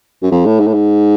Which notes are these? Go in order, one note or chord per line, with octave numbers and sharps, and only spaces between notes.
F#2
F2
A2
G#2
A2
G#2